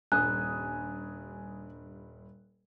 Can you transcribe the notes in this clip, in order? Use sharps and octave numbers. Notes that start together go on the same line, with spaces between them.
D#1 G2 G#5 D#6 F#6